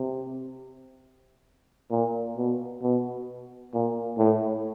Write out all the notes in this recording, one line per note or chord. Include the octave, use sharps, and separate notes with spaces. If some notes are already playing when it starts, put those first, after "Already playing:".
Already playing: C3
A#2
B2
B2
A#2
A2